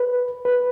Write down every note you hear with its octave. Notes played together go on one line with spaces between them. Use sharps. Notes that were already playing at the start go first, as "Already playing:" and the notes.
Already playing: B4
B4